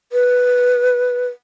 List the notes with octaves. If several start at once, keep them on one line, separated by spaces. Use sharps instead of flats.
B4